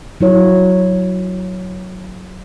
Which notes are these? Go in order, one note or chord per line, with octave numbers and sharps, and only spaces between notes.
F#3 E4 C#5